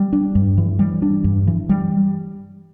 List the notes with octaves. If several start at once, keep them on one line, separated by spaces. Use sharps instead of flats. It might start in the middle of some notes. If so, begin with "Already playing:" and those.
Already playing: G3
D4
G2
E3
G3
D4
G2
E3
G3